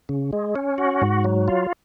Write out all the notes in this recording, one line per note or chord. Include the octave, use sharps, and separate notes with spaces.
C#3
G#3
C#4
F#4
G#2
F#3
F4